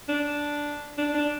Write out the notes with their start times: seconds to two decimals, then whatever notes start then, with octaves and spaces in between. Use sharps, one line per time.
0.09 D4
0.98 D4
1.15 D4